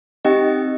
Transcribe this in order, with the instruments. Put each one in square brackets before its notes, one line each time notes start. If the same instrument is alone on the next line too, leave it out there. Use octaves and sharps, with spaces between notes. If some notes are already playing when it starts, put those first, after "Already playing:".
[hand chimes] C4 D#4 G4 D#5 G5